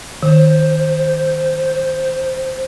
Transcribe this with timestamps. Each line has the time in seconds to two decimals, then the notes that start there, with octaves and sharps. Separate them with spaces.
0.23 D#3 C5